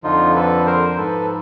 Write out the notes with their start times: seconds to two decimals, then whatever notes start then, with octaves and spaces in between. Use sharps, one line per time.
0.04 F2 D3 F3 D#4 F4
0.35 A4 B4
0.66 A#4 C5
0.90 C5
0.97 G#2 F3 A4 B4